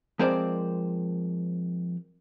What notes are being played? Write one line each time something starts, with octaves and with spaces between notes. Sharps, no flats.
F3 G#3 C4 A#4 C5 D5